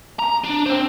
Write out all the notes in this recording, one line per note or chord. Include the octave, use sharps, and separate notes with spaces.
A#5
D4
C4 C5